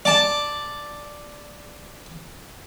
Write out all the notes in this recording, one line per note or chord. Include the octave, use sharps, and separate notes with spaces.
D5 A5